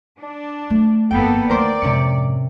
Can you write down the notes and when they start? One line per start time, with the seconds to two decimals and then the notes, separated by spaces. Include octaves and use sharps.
0.18 D4
0.70 A3
1.11 G1 F2 A#3 B3 A4 G5
1.50 D2 D#3 A#4 C5 D5
1.82 F2 G#2 C3 C#4 C#7